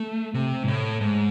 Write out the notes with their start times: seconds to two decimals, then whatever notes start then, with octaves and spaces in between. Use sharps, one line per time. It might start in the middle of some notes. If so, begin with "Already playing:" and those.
Already playing: A3
0.34 C3
0.63 G#2
0.68 A2
1.01 G#2